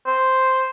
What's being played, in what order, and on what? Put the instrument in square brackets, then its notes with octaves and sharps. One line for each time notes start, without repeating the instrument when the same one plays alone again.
[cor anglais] C5